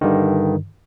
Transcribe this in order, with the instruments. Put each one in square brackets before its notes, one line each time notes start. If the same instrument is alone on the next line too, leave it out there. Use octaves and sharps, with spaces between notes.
[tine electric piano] G2 D3 D#3